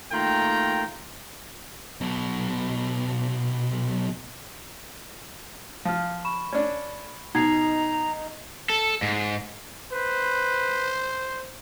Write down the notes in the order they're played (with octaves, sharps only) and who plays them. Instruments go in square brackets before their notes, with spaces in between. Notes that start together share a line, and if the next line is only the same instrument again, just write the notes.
[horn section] D#3 A3 A#3 F4 G5 A#5
[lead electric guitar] B1 B2
[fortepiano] F3 [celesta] F5 F6
[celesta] B5 C#6 E7
[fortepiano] C#4 D4
[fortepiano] B2 [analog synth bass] D#4 [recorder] A#5 [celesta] G#6 C7
[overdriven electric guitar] A4
G#2
[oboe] B4 [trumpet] C5